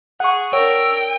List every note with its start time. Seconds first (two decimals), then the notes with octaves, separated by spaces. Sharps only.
0.20 G#4 F#5 C#6
0.53 D4 A#4 C#5 G5 E6